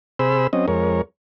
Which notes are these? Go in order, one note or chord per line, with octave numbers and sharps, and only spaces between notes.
C3 G#4 C5 B5 E6
F#3 C4 C#4 D#5
F2 G#3 A#4 C#5